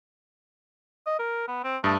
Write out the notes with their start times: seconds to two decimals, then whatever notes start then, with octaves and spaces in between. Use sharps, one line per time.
1.07 D#5
1.19 A#4
1.48 B3
1.64 C4
1.84 G2 A3 D#6